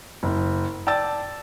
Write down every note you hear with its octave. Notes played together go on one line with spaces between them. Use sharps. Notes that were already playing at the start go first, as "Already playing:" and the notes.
F#1
D5 G5 A5 E6 A6